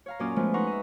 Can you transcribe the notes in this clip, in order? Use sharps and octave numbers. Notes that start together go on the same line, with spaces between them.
C#5 F5 A#5
F#2 A#2 A#3 C#4 D5 D#6
F3 G#3 A3 B3 F4
D#4 B4 F#5 A#5 C6 C#6
D#5 E5